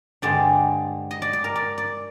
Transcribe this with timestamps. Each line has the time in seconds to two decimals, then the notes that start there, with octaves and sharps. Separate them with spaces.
0.22 G2 D3 G#3 C4 D5
1.11 D#5
1.22 D5
1.33 D5
1.44 A#4
1.56 D5
1.78 D5